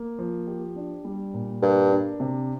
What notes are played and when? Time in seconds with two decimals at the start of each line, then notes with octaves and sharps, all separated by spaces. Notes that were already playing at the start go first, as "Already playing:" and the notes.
Already playing: A#3
0.19 F3
0.47 G4
0.76 D4
1.05 G3
1.34 A#2
1.62 G2 A#4
1.91 D4
2.20 C3